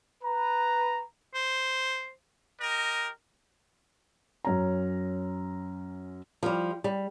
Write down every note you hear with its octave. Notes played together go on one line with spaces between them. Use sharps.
B4 A#5
C5
G4 A#4 D#5
F#2 C#4 A#5
F3 G3
G3